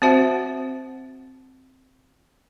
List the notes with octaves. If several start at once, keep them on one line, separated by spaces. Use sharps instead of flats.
C4 F#4 C5 E5 F#5